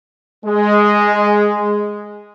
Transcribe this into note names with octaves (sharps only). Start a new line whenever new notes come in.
G#3